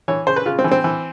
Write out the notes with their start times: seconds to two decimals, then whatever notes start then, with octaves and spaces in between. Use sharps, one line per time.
0.08 E3 C#5
0.27 C#3 C5
0.36 B4
0.46 C#3 F4
0.59 C4
0.64 E3
0.71 C4
0.84 E3